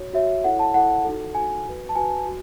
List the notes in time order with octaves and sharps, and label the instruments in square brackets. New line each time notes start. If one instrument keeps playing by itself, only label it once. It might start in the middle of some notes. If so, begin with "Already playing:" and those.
Already playing: [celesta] F#4 C#5
F#4 C#5 E5
E4 A4 C#5 F#5
A5
E4 A4 C#5 F#5
D#4 F#4 A4
D#4 F#4 A4 G#5
F#4 B4
A5
F#4 B4 G#5
F#4